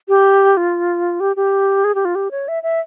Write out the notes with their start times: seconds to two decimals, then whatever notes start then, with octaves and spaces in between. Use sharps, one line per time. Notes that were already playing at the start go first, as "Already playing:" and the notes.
0.08 G4
0.57 F4
1.20 G4
1.36 G4
1.84 G#4
1.95 G4
2.05 F4
2.15 G4
2.31 C#5
2.48 E5
2.63 E5